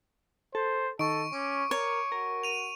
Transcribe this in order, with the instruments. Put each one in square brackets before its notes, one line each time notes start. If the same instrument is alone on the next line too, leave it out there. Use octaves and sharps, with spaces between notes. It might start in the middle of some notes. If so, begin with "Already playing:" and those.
[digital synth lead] A4 [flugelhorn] C5
[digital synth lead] D#3 [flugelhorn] A4 [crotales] C#6 D7
[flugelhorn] C#4 [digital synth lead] D6
[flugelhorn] A#4 [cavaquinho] C#5
[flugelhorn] F#4 [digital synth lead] A#4
[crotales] D#7 F7